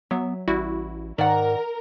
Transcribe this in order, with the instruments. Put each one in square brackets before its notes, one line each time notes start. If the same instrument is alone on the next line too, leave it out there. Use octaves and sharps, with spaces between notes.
[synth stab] F#3 [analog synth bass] B3 [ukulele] E5
[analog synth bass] A1 [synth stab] G3 E4 F#4
[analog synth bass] G#2 [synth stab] D#3 [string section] A#4 [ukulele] D5 F#5